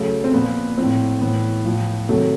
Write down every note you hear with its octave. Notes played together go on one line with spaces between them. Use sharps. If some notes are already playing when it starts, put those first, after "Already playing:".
Already playing: C#3 F#3 A3
C4
A#2 F3 B3
A2 F3 C4
A2 E3 B3
A2 F3
C3 D#3 F#3 A3